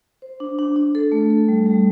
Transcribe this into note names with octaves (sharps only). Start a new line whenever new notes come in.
C5
D4
D4
D4
A4
A3
A4
G3
G3